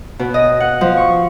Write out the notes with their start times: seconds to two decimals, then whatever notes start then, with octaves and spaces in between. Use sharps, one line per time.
0.19 B2
0.34 D#5
0.60 F#5
0.81 F3
0.97 C#6